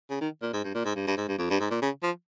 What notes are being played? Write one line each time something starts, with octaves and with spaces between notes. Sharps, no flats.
C#3
D#3
A#2
G#2
G2
A#2
G#2
G2
G2
G#2
G2
F2
G2
G#2
A#2
C#3
F3